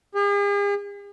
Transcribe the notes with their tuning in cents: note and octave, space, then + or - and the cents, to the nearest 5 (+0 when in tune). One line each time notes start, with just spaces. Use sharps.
G#4 -45